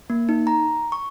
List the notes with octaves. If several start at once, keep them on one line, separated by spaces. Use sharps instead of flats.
A#3
D#4
A#5
C#6